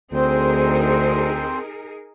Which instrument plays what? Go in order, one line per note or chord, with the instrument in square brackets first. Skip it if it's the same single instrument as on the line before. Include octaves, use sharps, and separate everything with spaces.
[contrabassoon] D2 [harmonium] C4 C5 [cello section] D#4 G#4 A#4